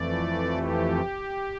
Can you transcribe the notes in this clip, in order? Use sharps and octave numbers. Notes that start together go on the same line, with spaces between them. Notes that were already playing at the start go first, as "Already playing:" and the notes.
Already playing: F2 E3 A3 D5
G4